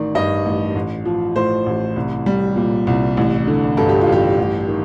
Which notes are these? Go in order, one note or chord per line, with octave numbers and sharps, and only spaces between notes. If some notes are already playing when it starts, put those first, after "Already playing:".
Already playing: A1 D#3 D5
G2 D#5
A1
A1
F3
A2 C5
A1
C2
G3
A#2
C2
A1
D3
G2 A4
G4
F4
A1 G4
A1
D#3